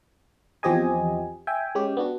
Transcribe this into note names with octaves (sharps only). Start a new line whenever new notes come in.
E2 F3 C4 G4 D#5 G#5
E5 G5 G#5
G#3 C#4 G4
B3 D4 F#4